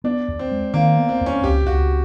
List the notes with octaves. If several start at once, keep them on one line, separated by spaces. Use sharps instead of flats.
B3 D4
D#2
C4
G#3
D#3 A#3
B3
C4
D#2
C#4
C#2 G4
C#2 F#4